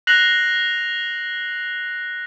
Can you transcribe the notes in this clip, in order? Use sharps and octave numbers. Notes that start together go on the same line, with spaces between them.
F#6 A#6 C7 F7 F#7